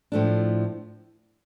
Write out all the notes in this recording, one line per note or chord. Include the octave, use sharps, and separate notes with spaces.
A2 F3 A3 D4